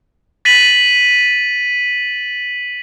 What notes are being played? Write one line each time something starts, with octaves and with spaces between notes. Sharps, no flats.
A6 B6 D#7 F#7